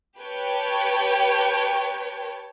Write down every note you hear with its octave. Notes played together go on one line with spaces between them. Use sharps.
G4 B4 C#5 G5 A5